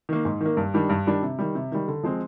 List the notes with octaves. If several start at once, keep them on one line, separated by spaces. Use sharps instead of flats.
D#3 A#3
G#2
D#3 A#3
G2
D#3 G3 D4
G2
D#3 G3 D4
C3
D#3 G3
C3
D#3 G3
D3
F3 G#3 C4